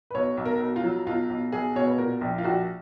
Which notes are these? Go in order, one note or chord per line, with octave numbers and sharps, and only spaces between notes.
B4
B1 C#5
B1
A#4
B1
F4
F#3
B1 F4
B1
B1 G#4
B2 C#5
B4
A#2 A#4
A#1
F4
A#1 F#4